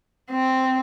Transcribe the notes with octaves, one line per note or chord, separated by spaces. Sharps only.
C4